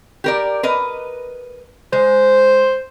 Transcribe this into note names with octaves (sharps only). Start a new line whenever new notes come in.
G4 A#4 D5
A#4 B4 D#5
G#3 C5